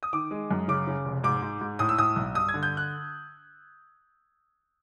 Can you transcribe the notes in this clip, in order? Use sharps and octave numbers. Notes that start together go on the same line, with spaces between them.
D#6
D#3 D6
G#3
F#2
C#3 D6
C#3
F1
G#2 D6
G#2
G#2
A2 D#6
E6
A2 D#6
B1
G2 D#6
G#6
D3
G6
F#6